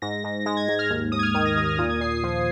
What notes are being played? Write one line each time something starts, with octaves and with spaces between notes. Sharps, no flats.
G#2 A#6
G#2
G#3 A#6
G#6
G#2 G#6
F6
D#2
D#2 D#6
G#6
F6
D#3 G#6
A#6
D#2 G#6
F6
A#2 D#6
G#6
A#2 C7
C7
F3